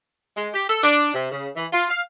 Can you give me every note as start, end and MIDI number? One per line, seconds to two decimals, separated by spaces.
0.36 0.47 56
0.53 0.68 67
0.68 0.79 69
0.83 1.11 62
1.13 1.29 48
1.30 1.48 49
1.55 1.65 52
1.72 1.84 65
1.89 2.00 77